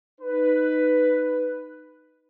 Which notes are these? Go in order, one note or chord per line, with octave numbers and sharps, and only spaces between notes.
D#4 B4